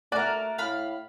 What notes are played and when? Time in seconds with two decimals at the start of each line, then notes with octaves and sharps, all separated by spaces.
0.12 A3 F#4 A#4 D5
0.58 A2 F5 B5